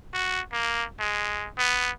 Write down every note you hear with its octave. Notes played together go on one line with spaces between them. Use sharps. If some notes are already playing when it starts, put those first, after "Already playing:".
F#4
A#3
G#3
B3